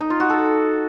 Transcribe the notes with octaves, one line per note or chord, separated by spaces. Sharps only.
D#4
F4
F#4
A4